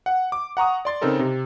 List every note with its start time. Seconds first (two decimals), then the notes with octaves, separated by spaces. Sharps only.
0.06 F#5
0.32 D6
0.57 F#5 A#5 C#6 D#6
0.85 D5 C6 A6
1.01 C#3 C4 D#4 A4 A#4
1.19 C3